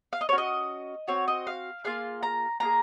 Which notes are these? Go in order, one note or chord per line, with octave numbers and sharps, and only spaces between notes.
F5
D#5
C#4 F#4 C#5
D#5
C4 F#4 C#5
D#5
F5
A#3 F4 G#4 F5
A#5
A#3 F4 G#4 A#5